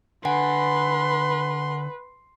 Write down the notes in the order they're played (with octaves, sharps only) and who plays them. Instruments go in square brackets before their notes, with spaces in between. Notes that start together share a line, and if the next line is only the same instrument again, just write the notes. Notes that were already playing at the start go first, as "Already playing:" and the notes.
[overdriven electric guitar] D3 [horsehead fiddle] B4 [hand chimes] F#5 G#5 [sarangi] C6